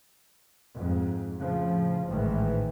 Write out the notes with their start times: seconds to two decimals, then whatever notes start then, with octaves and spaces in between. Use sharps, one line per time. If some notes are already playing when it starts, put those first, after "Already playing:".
0.75 F2 G#2
1.38 A2 C#3 F3
2.06 A1 G#2 D#3 E3